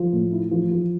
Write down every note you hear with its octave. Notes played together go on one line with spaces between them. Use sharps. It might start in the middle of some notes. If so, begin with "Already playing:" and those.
Already playing: F3
A2
E4
F3
F3